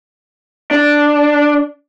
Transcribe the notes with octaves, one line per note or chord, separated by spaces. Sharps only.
D4